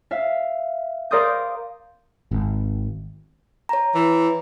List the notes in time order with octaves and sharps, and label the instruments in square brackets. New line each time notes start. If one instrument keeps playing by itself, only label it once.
[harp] E5 F5
A#4 D5 F5 C6 D#6 G6
[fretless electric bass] G#1
[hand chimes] C#5 A#5
[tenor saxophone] E3